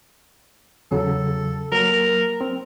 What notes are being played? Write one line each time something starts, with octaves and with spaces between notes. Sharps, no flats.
E2 C#3 F#3 A4
F#3 A#3 A#4
C4